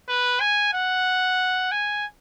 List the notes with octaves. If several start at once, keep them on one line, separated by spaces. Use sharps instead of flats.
B4
G#5
F#5
G#5